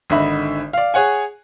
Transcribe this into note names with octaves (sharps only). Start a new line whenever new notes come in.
G#1 D3 D#4 E5 B5
D5 F5
G#4 C#5 F#5 G#5